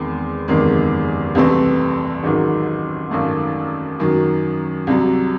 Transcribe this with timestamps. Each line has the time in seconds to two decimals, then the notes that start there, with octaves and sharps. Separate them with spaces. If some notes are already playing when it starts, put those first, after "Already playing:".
Already playing: E2 D#3 G#3 C4
0.48 F#1 E2 C3 D#3 G#3
1.35 C2 C3 E3 A3 C4
2.23 A1 G#2 D#3 F#3
3.11 G#1 F#2 D#3 A3
4.00 F#2 D#3 F#3
4.87 C2 C3 F#3